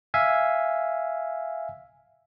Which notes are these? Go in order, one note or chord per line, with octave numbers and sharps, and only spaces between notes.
E5 F5 G#5